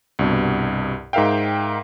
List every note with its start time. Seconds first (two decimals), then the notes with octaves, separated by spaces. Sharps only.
0.19 C2 G2 B2
1.13 G#2 D#4 A#4 E5 F5 G5